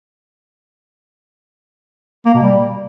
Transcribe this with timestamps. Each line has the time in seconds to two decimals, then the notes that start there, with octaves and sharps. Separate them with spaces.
2.26 A#3
2.34 B2
2.42 G3